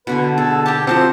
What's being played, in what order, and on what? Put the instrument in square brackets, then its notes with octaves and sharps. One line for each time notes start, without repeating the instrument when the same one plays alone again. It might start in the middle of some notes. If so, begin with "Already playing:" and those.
[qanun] B2 D3 G#5 [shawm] B4
[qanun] G#4 [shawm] A4
[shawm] G4 [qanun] A#4 A5
[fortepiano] F3 C4 [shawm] C5 [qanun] F#5 A5 A#5